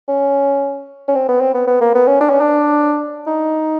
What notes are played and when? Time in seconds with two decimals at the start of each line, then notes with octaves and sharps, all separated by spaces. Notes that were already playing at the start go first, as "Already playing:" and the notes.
0.08 C#4
1.09 C#4
1.15 C4
1.29 B3
1.41 C4
1.55 B3
1.68 B3
1.81 A#3
1.95 B3
2.07 C#4
2.21 D4
2.30 C#4
2.41 D4
3.27 D#4